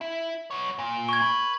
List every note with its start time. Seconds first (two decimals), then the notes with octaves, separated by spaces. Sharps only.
0.01 E4
0.51 B3 C#5
0.79 A#2
1.09 C#6 G#6
1.22 B4